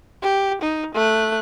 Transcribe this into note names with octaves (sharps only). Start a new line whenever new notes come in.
G4
D#4
A3 F#6